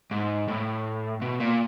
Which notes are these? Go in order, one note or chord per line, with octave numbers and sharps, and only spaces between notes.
G#2
A2
B2
A#2